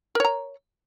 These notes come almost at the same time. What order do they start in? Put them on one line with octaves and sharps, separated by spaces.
A#4 C#5 A#5